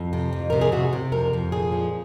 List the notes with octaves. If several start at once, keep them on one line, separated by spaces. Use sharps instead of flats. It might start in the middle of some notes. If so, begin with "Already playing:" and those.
Already playing: F2
C3
F2
C3 A#4
G#4
C3 F#4
C3
F2 A#4
F2
A#2 G#4
F3